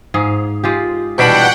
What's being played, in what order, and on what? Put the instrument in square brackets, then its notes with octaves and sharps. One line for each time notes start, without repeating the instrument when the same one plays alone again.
[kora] G#2 G#4 F5
G#3 F4 G4
[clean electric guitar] E2 G3 D4 [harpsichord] B2 B5 [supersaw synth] F#5 G5